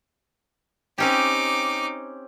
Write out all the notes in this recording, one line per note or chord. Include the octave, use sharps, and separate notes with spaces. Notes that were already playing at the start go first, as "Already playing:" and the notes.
C4 C#4 D#4 G4 D6